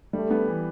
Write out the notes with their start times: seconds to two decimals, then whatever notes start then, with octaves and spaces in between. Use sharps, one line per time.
0.13 G3 A3
0.31 B3
0.48 E3